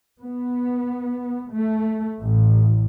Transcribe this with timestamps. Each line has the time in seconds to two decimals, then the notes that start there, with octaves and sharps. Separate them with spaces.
0.20 B3
1.53 A3
2.22 A1